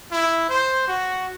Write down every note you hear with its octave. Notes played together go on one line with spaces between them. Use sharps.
E4
C5
F#4